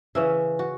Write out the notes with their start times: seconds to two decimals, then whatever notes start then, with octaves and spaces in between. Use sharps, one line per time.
0.15 C#3 E3 C#4 E5
0.59 F#4